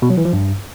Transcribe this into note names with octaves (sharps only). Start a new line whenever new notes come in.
B2
F#3
E3
F3
G2